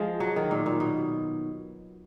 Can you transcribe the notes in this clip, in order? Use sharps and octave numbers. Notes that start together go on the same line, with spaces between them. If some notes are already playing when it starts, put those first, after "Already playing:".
Already playing: F3 G#3
F#3
D#3
A#2
A#2
B2